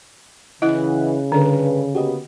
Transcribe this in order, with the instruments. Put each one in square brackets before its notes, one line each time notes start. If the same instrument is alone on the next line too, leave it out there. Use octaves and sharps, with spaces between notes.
[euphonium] C#3 [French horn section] E3 [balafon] E4 [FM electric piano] D#5 F#5 F#6
[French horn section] G2 B4 [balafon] D3 [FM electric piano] D4 A4
[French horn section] A#3 B3 [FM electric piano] F#4 G4 D#5